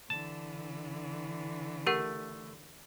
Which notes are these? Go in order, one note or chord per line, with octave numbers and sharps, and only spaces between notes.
D3 E3 A5
A3 G4 A#4 F#5